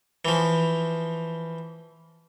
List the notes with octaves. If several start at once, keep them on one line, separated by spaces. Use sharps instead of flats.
E3 F3